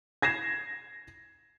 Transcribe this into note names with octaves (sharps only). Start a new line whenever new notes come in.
G#6 A#6 C7 E7